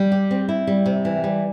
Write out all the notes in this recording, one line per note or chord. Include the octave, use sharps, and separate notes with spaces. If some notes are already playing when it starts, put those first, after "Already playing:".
Already playing: G3
G4
C4
E4
G3
C3
E3
G3